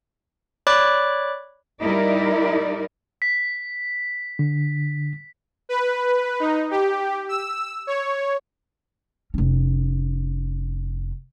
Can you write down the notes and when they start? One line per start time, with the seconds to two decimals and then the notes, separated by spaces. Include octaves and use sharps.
0.67 C#5 D5 B5 D6 F#6
1.82 G3 D#4 E4 A#4 D5
3.22 B6
4.39 D3
5.69 B4
6.40 D#4
6.71 G4
7.29 E6
7.87 C#5
9.34 F1 C#4